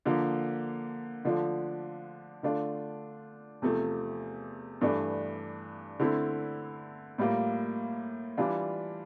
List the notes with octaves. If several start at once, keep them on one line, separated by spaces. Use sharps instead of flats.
D3 F3 A#3
D3 F3 A3 D4 F4
D3 A3 D4 F4
E2 C3 F3 A3
G2 E3 A3 D4
D3 A3 C4 E4
A2 G3 A#3 F4
E3 G3 D4 F4